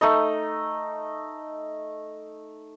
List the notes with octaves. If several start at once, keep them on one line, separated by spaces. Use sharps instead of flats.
A3 D#4 D#5